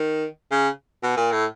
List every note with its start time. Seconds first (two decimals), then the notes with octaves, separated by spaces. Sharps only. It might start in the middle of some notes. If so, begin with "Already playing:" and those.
Already playing: D#3
0.52 C#3
1.03 B2
1.17 A#2
1.32 A2